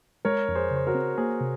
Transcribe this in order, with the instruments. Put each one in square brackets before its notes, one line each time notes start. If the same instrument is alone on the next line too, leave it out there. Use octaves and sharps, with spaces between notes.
[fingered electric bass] G#3 [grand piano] A#4 C#5
[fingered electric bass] F2
[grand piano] G#4 C5
[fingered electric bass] C#3
[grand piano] C5
F#4 A#4
[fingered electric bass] C4
[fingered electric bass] A#3 [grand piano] G#4 C5
[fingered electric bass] C3